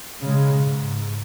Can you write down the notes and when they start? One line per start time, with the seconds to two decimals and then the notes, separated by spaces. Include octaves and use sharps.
0.21 C#3 G#3
0.62 G#2